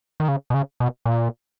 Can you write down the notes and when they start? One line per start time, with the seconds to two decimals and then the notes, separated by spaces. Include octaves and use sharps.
0.20 D#3
0.28 C#3
0.50 B2
0.54 C#3
0.80 B2
1.05 A#2